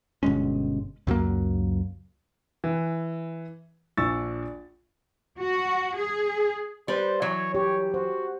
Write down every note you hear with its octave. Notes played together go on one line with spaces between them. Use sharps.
G1 B2 G#3 C#4
C#2 F#2 F#3 A#3
E3
A#1 D4 C#6 E6 A6
F#4
G#4
G3 B4 C5
E3 F#3 C#5
G4 C#5
F#4 C5